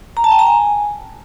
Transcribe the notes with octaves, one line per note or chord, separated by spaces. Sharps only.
A#5
A5
G5
A#5
G#5